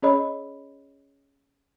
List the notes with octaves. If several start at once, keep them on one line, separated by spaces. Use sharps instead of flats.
C#4 G#4 C#5 D#5 B5